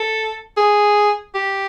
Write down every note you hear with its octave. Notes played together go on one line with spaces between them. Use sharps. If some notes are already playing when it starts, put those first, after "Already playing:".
Already playing: A4
G#4
G4